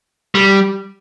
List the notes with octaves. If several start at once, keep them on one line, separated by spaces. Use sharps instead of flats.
G3